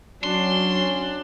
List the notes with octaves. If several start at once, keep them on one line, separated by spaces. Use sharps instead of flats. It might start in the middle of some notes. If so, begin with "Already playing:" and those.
F#3 C#4 D4 C6